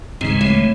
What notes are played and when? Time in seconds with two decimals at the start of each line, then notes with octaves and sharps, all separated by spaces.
0.21 D2 G#2 C#3 E3 G#3 C4
0.41 A2